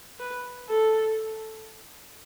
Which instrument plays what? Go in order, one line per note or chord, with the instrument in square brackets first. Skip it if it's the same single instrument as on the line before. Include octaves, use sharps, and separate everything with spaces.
[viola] B4
A4